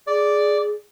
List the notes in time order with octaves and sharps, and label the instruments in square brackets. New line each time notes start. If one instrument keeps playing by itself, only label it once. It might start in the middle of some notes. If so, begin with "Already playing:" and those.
[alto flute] G#4 [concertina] D5